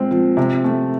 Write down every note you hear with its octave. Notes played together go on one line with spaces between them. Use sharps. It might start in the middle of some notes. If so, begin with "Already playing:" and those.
Already playing: A#2 G#3 C4
F3
C3
A3